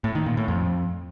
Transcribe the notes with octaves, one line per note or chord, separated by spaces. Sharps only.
A2
D#3
A#2
A2
F2